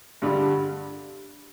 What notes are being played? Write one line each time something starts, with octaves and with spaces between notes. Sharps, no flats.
G2 D3 G3